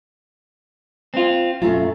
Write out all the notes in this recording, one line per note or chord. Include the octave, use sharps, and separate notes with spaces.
C4 F4
F#2 B2 A3 F4